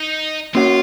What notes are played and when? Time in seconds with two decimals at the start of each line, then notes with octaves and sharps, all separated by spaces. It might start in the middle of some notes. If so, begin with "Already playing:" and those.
Already playing: D#4
0.55 A#3 C#4 F4 F#4 C#5 F#5